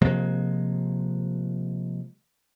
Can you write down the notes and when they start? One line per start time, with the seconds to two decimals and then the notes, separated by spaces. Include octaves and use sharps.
0.02 C3 F3 G#3 A#3